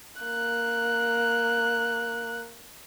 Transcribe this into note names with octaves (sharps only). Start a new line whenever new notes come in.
A#3 F#6